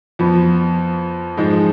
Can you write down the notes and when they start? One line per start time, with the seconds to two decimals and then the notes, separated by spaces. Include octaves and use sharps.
0.19 F2 F3 B3
1.37 G#2 F3 G#3 D#4